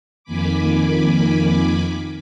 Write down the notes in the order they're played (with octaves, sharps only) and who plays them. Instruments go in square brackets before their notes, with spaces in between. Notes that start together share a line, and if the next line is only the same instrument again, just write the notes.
[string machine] F2 D#3 A#3 G#5 B5 D6